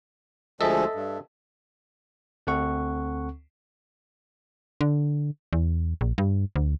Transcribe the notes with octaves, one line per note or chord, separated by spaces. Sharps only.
D2 F3 G#3 A4 D#5 E5
G2
D2 C4 A4 F#5 C#6
D3
E2
A#1
G2
D2